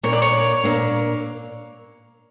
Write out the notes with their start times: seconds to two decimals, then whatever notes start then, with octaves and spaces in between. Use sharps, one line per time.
0.03 A#2 A#3 D4 C#5
0.13 D5
0.22 C#5
0.63 A#2 A#3 D4